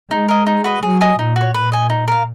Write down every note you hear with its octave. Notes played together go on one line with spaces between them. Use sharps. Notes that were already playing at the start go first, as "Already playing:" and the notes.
G#3 D#4
A#4 D#5
D#4
F#4 B4 D#5
F#3 G#4
D#5 G#5 D#6
A#2 D#4
F#4 C#5
A#2 B4
D#5 G#5
D#4
A#4 F5